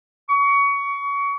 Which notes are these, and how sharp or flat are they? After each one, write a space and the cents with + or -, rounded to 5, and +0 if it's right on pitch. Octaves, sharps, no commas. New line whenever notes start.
C#6 +25